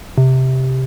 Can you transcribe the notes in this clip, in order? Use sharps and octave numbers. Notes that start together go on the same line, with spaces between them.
C3